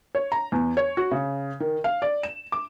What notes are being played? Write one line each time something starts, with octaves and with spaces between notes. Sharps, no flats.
C#5
A#5
E2
C#5
F#4
C#3
D#3
F5
D5
E7
D6